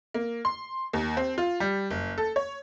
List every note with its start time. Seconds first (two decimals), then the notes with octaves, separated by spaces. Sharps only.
0.15 A#3
0.45 C6
0.93 D#2
1.17 C4
1.38 F4
1.60 G3
1.90 F#1
2.18 A4
2.36 C#5